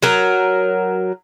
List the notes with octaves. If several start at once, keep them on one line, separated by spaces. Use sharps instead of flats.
F#3 A#4